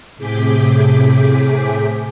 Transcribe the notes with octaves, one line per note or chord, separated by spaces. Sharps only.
A2 C3 G#4 D6 G6 B6